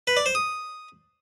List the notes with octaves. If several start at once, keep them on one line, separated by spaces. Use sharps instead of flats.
B4
D5
C5
D#6